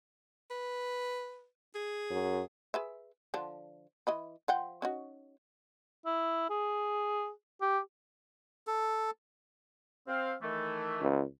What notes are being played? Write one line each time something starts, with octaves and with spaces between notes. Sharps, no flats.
B4
G#4
F#2
G#4 B4 E5
D3 F3 D4
E3 D#5 B5
F3 F#5 G5
C#4 D#4 F#4
E4
G#4
G4
A4
C4 F5
D#3 E3 A3
C#2